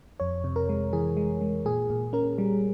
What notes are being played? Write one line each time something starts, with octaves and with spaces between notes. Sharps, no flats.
F2 C#5
C3
A#4
G#3
E3 G#4
G#3
G#3
A#2 G#4
A#2
C#4 A#4
G3